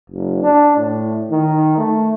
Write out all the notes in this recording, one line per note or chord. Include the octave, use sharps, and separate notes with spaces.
F#1
D4
A2
D#3
A3